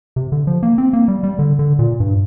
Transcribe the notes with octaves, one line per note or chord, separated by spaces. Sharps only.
C3
D3
F3
A#3
C4
A#3
G3
G3
D3
D3
A#2
G2